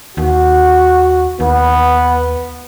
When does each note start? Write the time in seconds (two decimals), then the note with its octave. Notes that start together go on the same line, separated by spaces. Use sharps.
0.17 D#2 F#4
1.40 D#2 B3